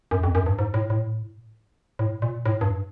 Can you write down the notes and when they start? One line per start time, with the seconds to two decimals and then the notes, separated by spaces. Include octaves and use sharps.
0.11 F#2
0.23 F2
0.35 F#2
0.46 G2
0.59 G#2
0.74 A2
0.90 A2
1.99 A2
2.22 A#2
2.46 A2
2.61 G2